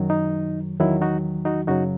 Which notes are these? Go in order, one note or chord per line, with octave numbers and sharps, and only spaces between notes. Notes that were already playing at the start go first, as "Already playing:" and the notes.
Already playing: F#2 D#3 F#3
D#4
E2 D#3 F#3 E4
D#4 F#4
D#4 F#4
F#2 C#3 F#3 D#4 F#4